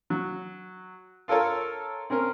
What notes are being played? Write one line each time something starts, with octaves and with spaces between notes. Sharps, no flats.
F#3
F4 A4 A#4 C#5 A5
C4 C#4 A#4